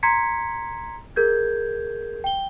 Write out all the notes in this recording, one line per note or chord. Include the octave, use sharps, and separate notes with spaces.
A#5 C6 G#6 B6 C#7
G#4 A#4 G6 G#6
G5 G7